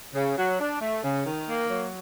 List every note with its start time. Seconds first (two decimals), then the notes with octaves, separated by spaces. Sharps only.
0.15 C#3
0.37 F#3
0.59 D4
0.81 A3
1.03 C#3
1.25 D#3
1.48 A#3
1.70 F#3